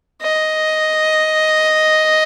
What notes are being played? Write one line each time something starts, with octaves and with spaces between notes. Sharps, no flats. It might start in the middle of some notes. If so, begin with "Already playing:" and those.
D#5